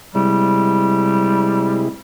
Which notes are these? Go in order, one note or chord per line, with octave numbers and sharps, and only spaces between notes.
C3 G3 G#3 E4